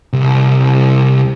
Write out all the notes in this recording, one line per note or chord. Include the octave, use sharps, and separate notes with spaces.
C2